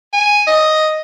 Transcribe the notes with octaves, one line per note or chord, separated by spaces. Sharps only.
G#5
D#5